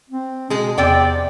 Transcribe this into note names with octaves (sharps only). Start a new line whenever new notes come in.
C4
B2 G#3 G#4
E2 C3 D5 G5